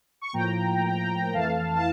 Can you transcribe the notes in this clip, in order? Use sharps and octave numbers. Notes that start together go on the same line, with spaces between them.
C#6
A2 F3 A#3 G5 A#5
F2 E3 A3 F5 A5
A5